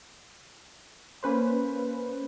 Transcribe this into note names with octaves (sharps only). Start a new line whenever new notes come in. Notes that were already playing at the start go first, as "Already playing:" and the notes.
A#3 C#4 B4 C5